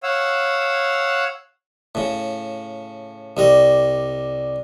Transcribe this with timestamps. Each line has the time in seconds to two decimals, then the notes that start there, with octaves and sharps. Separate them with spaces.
0.03 C#5 F5 F#5 E6
1.95 A2 C#3
3.37 C2 G3 D#5